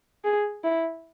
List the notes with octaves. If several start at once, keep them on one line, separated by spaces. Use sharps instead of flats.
G#4
E4